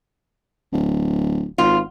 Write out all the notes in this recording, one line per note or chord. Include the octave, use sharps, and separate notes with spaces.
D1
G#1 F4